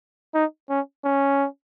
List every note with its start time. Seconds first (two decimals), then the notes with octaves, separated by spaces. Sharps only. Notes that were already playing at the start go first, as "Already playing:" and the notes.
0.34 D#4
0.70 C#4
1.05 C#4